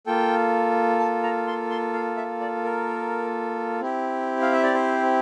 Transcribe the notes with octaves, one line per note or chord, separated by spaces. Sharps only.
A#3 F4 A4 G5
A5
A#5
C6
C6
F5
E5
D5
A#4
C4 E4 G4
F5
E5
D5
C5